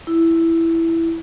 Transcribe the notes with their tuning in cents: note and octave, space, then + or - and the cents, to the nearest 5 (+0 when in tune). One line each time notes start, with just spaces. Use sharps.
E4 +5